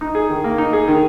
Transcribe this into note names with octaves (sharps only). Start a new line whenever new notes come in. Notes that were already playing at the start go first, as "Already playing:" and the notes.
D#4
G#4
D#3
A#3
D#4
G#4
D#3